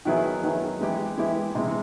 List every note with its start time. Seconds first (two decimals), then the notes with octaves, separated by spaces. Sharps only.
0.05 D#3 F#3 B3 E4 G#4
0.43 D#3 F#3 B3 E4 G#4
0.80 E3 G#3 B3 E4 G4
1.17 E3 G#3 B3 E4 G4
1.55 C3 E3 G#3